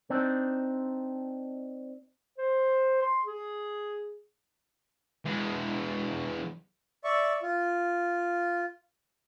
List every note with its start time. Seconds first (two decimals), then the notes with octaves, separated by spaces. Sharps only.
0.10 C4 D4 D#4
2.38 C5
3.02 C6
3.25 G#4
5.25 E2 G#3
7.04 D5 E5 C#6
7.42 F4